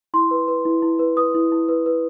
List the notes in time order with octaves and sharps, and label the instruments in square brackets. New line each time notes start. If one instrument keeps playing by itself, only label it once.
[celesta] E4 C6
B4
B4
E4
E4
B4
B4 D#6
E4
E4
B4
B4